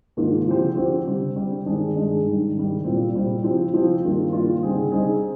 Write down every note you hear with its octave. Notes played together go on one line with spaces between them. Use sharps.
G#2 D#3 A#3 D4 F4
D3 F3 C4 G4 C5
D3 F3 C4 G4 C5
D3 G3 C4 G4
D3 G3 C4 G4
G2 D#3 G#3 D4 G#4
G2 D#3 G#3 D4 G#4
G#2 D#3 G3
G#2 D#3 G3
A#2 G3 C4
A#2 G3 C4
F3 C4 G4 C5
F3 C4 G4 C5
G2 D#3 G3 A#3 F4
G2 D#3 G3 A#3 F4
D3 G3 C4 D#4 G#4
D3 G3 C4 D#4 G#4